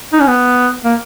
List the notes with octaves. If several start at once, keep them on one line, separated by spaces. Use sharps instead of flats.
D#4
C#4
B3
A#3